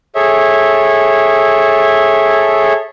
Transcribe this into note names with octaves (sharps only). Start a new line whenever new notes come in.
G#4 A4 C#5 E5